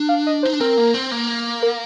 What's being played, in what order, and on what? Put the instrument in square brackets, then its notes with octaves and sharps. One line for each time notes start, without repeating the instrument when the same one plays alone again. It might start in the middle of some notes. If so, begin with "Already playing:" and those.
Already playing: [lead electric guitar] D4
[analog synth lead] F5
D#5
C5
[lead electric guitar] D#4
D4
[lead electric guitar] C4 [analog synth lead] A#4
[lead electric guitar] A#3
C4
A#3
[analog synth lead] A#4